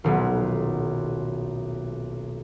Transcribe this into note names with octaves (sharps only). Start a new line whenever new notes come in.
D#1 B1